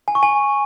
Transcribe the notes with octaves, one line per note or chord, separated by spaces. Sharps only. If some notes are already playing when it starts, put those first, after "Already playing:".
G#5
C#6
G#5